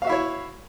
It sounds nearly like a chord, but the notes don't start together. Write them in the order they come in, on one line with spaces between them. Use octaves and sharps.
F5 F#4 E5 E4 C#5